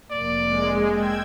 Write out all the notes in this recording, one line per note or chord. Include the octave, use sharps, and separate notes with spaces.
F1 A#3 D5
G#3
G5 E6 G#6